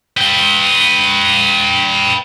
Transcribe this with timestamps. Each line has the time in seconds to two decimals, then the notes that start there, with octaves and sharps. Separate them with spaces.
0.17 B4 G5